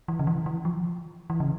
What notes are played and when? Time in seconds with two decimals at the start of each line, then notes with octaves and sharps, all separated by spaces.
0.08 E3
0.19 C#3
0.27 E3
0.46 E3
0.65 F3
1.30 E3
1.40 C#3